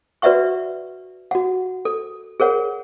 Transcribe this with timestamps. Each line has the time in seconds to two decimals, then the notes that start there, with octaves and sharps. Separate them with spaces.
0.22 F#4 B4 D5 E5 F#5 C#6
1.31 F#4 F#5
1.85 A4
2.40 G#4 A#4 C#5 F#5